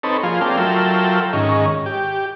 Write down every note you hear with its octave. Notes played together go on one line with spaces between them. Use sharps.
C4 D#4 A4 B4 C#5
F3 A#3 F4 G#4
A3 C4 D4 A#4 F5 G5
F#3 F4 A4 A#4 E5 G5
G#2 D#3 C#4
G4